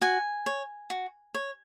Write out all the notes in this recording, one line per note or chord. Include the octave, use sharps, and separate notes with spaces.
F#4 G#5
C#5
F#4
C#5